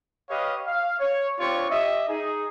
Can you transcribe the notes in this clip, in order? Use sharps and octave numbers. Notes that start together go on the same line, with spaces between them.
G4 B4 C#5 D#5 F5
F5
C#5
C4 D4 F4 G4 C#5 C#6
G4 D#5 E5
D#4 G#4